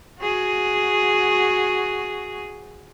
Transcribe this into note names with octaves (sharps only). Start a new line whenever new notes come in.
F#4 G#4